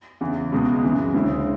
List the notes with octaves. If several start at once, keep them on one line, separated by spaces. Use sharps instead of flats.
E2 C#3 E3
C#2 B2 G#3 B3
F#2 C#3 E3 G#3
D2 C#3 G#3 C#4 E4